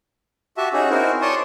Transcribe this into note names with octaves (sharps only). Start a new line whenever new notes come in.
F#4 G4 E5 A5
C#4 D#4 F#4 G#4
C4 D#4 E4 F#4 A#4 C5
C#5 D5 A5 C6 C#6 D#6